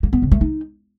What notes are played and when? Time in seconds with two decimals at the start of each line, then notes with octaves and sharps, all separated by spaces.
0.03 A#3
0.13 B3
0.22 C#3
0.32 A3
0.41 D#4